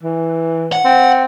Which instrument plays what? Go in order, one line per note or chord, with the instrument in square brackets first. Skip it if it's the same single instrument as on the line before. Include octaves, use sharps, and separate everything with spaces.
[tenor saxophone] E3
[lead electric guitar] F#5
[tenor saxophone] C4